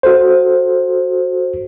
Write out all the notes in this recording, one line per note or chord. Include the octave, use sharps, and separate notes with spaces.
F#4 A4 C5